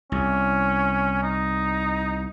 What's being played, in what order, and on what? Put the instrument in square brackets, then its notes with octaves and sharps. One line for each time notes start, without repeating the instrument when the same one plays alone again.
[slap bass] C2 [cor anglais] C#4
[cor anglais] D#4